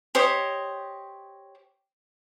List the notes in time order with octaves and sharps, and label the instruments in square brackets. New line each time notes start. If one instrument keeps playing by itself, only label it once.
[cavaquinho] G4 C5 C#5 D#5